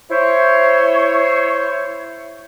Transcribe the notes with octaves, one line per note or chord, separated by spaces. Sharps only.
E4 C5 C#5